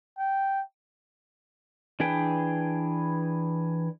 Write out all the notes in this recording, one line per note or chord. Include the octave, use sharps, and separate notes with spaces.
G5
E3 D4 G#4 B4 G5